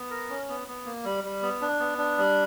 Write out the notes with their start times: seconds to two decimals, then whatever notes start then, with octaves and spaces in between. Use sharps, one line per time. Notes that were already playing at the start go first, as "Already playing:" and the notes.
Already playing: B3
0.11 A#4
0.30 C#4
0.49 B3
0.68 B3
0.86 A#3
1.05 G3
1.24 G3
1.42 B3
1.61 D4
1.79 B3
1.98 D4
2.18 G3